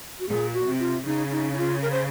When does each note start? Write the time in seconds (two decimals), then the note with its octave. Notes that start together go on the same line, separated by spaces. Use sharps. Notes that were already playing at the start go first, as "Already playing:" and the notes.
0.20 F#4
0.28 A#2 G#4
0.54 F#4
0.67 C3
0.80 F4
1.05 C#3 D#4
1.31 D#4
1.53 D#4
1.57 F4
1.82 A#4
1.92 C5